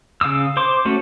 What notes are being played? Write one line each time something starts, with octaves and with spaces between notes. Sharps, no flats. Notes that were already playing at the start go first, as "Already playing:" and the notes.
C#3 F5 D#6 E6
C5 C6 D6
A3 C#4 F#4